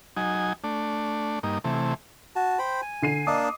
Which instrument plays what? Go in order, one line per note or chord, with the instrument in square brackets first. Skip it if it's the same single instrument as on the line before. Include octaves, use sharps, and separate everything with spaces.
[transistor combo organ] F#3 D#4 G#5
A3 D4
G2 A#3 D#4
C3 E3 A3
[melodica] F#4 A5
C5 G5 B5
G#5
[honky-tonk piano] D3 C7 D#7
[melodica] A#3 D4 A5 [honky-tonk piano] D#5 D6 D#6